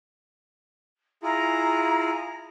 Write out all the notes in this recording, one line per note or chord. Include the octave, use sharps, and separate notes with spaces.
E4 F4 G#4 A#5